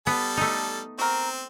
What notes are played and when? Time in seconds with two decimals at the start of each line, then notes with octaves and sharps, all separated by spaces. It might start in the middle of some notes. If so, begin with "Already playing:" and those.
0.07 G3 B3 A4
0.37 A3 D#4
0.99 C4 F#4 A#4